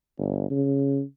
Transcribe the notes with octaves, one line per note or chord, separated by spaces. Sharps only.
G1
C#3